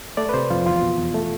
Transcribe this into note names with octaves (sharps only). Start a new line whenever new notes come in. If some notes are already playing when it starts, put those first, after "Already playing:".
A3 D5
B4
C3 C5
F2 F4
E2 F4
B2
E2
A3